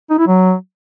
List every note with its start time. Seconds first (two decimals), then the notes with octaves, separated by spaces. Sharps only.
0.10 D#4
0.19 E4
0.27 F#3